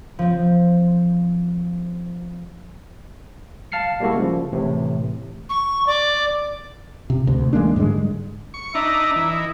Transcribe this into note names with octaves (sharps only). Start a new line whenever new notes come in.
F3 C4
F5 A5 F6 C7 C#7
G3 G#3 A#3 E4 F#4 A4
C#3 F3
A2 C3 E3
C#6
D5
C3
D2 C3
E3 G#3 A#3 D4
G#2 D3 G3 G#3
C#6
D4 D#4 E5 A#5
E3
D#5